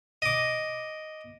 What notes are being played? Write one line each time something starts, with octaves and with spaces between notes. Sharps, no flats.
D#5 D6